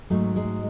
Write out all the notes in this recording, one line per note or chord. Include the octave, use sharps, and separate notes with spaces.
G#2 F#3 A3
G#3